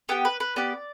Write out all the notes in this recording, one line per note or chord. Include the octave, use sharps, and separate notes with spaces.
B3 G4 G5
B4
B4
B3 G4 D5